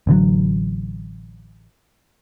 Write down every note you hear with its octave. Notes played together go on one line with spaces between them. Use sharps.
A1 D3 D#3 F#3